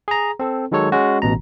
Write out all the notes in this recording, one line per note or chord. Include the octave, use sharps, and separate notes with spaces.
G#4 A#5
C4 A4
D#3 F#3 G#3 A4 C#5
G#3 C#4 F#4
A1 B2 A#5